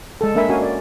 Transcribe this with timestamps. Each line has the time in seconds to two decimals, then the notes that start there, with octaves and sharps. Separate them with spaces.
0.21 G#3 A4
0.35 A#3 D4 A#4 E5 G#5 B5
0.49 C#4 F#4 A#4 F5 G#5
0.62 D5